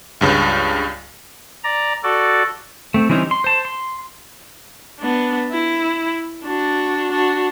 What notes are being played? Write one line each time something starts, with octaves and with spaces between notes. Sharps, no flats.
C#2 G2 C#3
D5 A#5
F#4 A4 D5
A3 C4
E3 G3 C4 C#4 D#4
C6
C5 A5
C6
B3 D4
E4
D4 F#4
D4 F#4